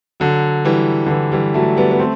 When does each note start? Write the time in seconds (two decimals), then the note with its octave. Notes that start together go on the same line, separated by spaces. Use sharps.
0.20 D3 F#3
0.65 E3 G3
1.06 D3
1.11 E3
1.32 E3 G3
1.54 F#3 A3
1.77 G3 B3
1.91 B3
1.99 A3 C4